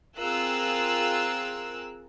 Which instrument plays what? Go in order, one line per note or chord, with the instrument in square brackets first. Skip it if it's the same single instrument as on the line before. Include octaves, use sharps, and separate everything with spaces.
[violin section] C4 F4 G#4 A#4 E6 F#6